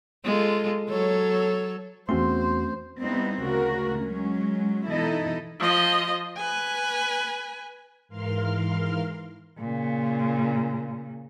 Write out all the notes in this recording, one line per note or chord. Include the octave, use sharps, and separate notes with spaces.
G#3 F4 A4
F#3 A4 C#5
E2 A3 C4 C#4 F#4 C5 C6
G3 B3 C4 D#4 E4
D2 C#3 F#4 A#4
F#3 G#3 C#4
B2 E3 D#4 E4 A4 D#5
F3 D#5
B4 G#5
G#2 E3 A#4 F5 C6 F6
A#2 C#3